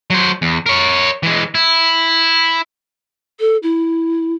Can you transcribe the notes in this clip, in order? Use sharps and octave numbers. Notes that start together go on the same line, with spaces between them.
F#3 C5
E2
A#4 C#5
E3 G#3
E4
A4
E4